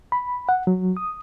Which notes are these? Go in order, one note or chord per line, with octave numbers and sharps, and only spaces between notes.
B5
F#5
F#3
D#6